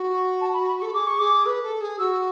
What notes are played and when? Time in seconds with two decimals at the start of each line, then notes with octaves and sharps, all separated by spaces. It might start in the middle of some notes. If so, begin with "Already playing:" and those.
Already playing: F#4
0.14 C#6
0.41 A5
0.53 B5
0.67 B5
0.80 C#6
0.82 A4
0.94 G#4 D6
1.07 C#6
1.19 G#4 D6
1.46 B4
1.63 A4
1.81 G#4
1.99 F#4 E6